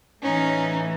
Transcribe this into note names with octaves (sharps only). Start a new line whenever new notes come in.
A2 E3 C#4 D#4